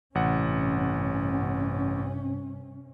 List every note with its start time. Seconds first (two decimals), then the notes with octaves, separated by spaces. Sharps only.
0.15 A1 G2 C3 C#4 F#5